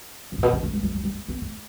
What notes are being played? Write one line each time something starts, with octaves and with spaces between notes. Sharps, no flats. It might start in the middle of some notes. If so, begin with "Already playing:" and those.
C#3
A2
B2
C#3
A3
G3
F#3
F#3
G3
A3
B3
A3